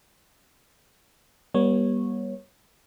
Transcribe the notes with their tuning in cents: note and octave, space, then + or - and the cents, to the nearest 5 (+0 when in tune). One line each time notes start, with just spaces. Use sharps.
G3 +0 B3 -40 C#5 -15